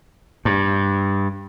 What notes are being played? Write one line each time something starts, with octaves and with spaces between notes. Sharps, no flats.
G2